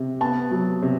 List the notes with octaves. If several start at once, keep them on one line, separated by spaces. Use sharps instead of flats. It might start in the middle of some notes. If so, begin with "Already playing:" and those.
Already playing: C3
B3 A5
F#3
C3